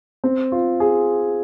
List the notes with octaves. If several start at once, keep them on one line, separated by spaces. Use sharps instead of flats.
C4
F4
G#4